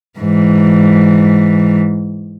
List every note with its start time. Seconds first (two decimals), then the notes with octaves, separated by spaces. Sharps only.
0.19 G#2 E3